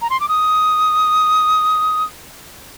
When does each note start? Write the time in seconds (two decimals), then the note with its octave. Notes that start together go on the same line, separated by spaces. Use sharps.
0.02 A#5
0.10 C6
0.20 D6
0.29 D#6